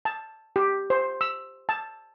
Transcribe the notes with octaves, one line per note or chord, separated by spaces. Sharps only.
A5
G4
C5
E6
A5